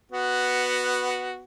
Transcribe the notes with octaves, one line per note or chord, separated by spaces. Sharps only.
B3 F#4